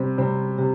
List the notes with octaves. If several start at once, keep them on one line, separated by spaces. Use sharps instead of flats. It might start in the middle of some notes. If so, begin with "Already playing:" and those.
Already playing: C3 G3 C4
C3 G3 C4
C3